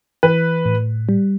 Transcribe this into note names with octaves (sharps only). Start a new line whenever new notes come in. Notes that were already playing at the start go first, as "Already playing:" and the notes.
E3 B4
A2
G3